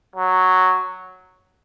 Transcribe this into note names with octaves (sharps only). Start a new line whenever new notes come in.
F#3